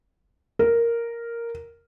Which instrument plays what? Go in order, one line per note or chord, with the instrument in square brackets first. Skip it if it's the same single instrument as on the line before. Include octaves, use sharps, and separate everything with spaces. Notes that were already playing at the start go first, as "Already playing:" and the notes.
[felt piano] A#4